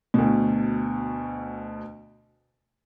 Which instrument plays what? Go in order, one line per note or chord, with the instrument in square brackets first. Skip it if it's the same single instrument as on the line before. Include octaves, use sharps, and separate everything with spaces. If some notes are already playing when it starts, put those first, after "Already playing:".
[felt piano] D2 B2